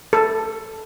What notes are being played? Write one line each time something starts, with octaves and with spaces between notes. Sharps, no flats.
A4